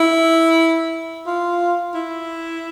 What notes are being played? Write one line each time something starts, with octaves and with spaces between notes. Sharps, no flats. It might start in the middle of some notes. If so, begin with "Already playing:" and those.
Already playing: E4
F4
E4